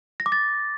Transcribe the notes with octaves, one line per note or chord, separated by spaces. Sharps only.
A#6
D6
A6